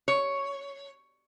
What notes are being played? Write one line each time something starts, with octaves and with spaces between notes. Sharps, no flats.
C#5